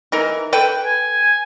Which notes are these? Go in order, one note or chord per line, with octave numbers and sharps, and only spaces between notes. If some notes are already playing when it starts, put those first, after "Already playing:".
E3 D#4 A#4
A4 B4 G5
G#5